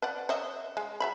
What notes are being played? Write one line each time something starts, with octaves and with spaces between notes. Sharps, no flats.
B4 D5 F#5
C#5 D#5 E5
G#3
F#3 E5 B5